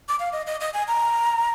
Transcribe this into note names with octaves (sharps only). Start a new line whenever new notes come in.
D6
F5
D#5
D#5
D#5
G#5
A#5